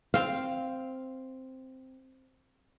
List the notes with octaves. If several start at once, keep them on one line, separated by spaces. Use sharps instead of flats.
C4 F5